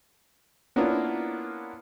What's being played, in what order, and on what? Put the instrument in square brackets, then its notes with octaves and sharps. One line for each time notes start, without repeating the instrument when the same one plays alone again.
[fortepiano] A#3 B3 C#4 D4 E4 F4